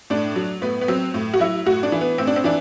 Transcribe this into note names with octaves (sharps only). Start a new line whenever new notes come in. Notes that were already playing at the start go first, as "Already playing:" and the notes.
A2 D4
F#3
A2 B3
B3
F#3 C4
A2
F#4
F#3 E4
A2 F#4
D4
E3
B3
A2 C4
D4
C4
E3 D4